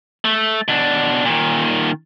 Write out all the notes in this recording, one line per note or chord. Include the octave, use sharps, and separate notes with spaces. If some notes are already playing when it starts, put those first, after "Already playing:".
A3
B2 D4
A#2 D#3